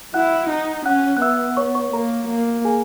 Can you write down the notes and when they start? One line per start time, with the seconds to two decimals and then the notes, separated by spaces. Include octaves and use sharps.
0.14 E4 F#5 F#6
0.49 D#4
0.86 C#4 F#5 F#6
1.17 F#6
1.21 B3 E5 E6
1.57 C#5 C#6
1.75 C#5 C#6
1.93 A#3 A#4 A#5
2.29 A#3
2.65 G#4 G#5